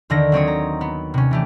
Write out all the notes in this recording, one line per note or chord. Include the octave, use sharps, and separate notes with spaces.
D#2 D3 D#3 A#6
F#3 C4 C#5 D#6
A#5
B3
C3 C#4
E3 A3 G4